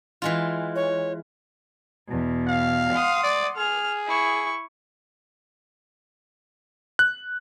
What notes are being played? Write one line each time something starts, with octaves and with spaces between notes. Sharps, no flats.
E3 G#3 F4
C#5
E2 B2
F5
F#5 C6 D#6
D5
G#4 F6
E4 C#6
F#6